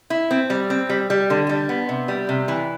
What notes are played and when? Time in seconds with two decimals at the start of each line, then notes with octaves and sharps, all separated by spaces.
0.10 E4
0.31 C4
0.50 G3
0.70 C4
0.90 G3
1.10 G3
1.30 D3
1.49 G3
1.69 B3
1.89 C3
2.08 G3
2.29 C3
2.48 E3